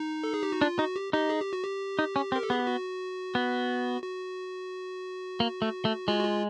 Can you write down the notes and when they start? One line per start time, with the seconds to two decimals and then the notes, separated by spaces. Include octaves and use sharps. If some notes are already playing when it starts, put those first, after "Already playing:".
Already playing: D#4
0.24 A4
0.34 G#4
0.43 G4
0.52 F#4
0.61 D4 F4
0.79 D#4 F#4
0.96 G4
1.13 D#4 G4
1.30 G#4
1.41 G4
1.53 F#4
1.64 G4
1.99 D#4
2.16 C#4
2.32 C4
2.35 A#4
2.43 A4
2.50 B3 G#4
2.59 G4
2.67 F#4
3.35 B3
4.03 F#4
5.40 A#3
5.62 A3
5.85 A3
6.08 G#3 F4
6.19 F#4
6.25 F4